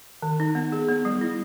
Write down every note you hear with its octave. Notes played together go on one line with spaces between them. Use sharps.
D#3
D#4
B3
G#4
B3
G3
E4